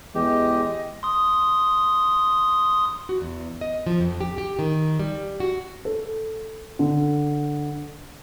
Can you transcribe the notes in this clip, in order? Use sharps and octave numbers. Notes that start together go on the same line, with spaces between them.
E2 G#3 G4 D#5
C6 D#6
F#4
E2
D#5
F3
F2
G4
G4
D#3
G3
F#4
A4
D3